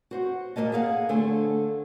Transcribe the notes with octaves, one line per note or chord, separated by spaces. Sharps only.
F#4 C5 F#5
A#2 A3 A#3 D#5 A5
G#4 A4 F5 F#5
D3 A3 A4 C5 G#5